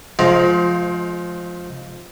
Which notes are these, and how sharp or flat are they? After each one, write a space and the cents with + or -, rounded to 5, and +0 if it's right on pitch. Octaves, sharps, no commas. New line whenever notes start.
F3 +5 G#3 +40 D#4 +0